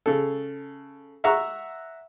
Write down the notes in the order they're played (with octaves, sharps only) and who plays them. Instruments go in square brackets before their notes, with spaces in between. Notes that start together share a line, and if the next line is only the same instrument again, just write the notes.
[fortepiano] C#3 A4
E5 F#5 A#5 C#6 E6